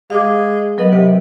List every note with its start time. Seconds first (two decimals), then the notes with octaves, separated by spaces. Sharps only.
0.10 G#3 F5 D6
0.78 F#3 B3 A#4 D#5
0.91 C3